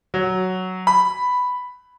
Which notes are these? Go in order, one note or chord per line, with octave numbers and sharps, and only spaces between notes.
F#3
B5